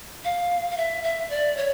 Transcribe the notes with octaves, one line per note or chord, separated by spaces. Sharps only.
F5
F5
E5
E5
D5
C#5